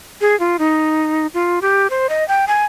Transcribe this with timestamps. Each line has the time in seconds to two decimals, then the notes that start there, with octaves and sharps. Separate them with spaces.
0.21 G#4
0.40 F4
0.59 D#4
1.34 F4
1.62 G4
1.90 C5
2.09 D#5
2.28 G5
2.48 G#5